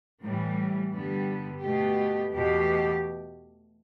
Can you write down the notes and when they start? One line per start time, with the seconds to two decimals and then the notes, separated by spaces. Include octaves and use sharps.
0.22 A2 E3 G3
0.93 G2 D3 G3 B3
1.63 B2 A3 G4
2.33 E2 B2 A3 G4